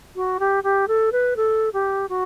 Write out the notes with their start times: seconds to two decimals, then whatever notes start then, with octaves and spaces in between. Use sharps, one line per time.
0.16 F#4
0.40 G4
0.64 G4
0.88 A4
1.12 B4
1.37 A4
1.73 G4
2.09 F#4